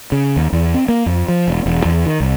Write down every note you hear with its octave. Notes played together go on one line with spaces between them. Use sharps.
C#3
D#2
E2
C4
A#3
F2
F3
E1
E1
E2
D#3
C2